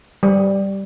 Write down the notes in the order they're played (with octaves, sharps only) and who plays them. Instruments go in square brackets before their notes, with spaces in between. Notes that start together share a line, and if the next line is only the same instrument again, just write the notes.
[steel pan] G3